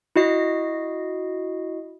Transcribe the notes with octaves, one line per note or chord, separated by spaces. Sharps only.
E4 F#4 D#5 C7